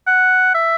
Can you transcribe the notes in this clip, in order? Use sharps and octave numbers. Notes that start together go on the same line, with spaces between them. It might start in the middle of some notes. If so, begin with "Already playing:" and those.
F#5
E5